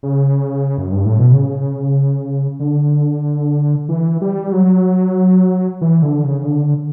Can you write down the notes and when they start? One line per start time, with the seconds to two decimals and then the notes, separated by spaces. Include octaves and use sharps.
0.03 C#3
0.78 F#2
0.92 G2
1.06 A2
1.19 B2
1.32 C#3
2.60 D3
3.89 E3
4.21 G3
4.52 F#3
5.81 E3
6.02 D3
6.24 C#3
6.45 D3